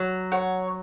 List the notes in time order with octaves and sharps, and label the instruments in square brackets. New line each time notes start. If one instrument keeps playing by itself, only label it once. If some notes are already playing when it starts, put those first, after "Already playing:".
Already playing: [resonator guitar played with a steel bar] F#3
[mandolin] C#5 F#5